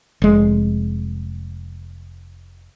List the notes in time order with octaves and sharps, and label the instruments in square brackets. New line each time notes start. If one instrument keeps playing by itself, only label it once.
[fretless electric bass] F1 G#3